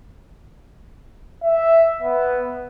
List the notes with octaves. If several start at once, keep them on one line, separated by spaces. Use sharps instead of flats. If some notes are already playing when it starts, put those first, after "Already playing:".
E5
B3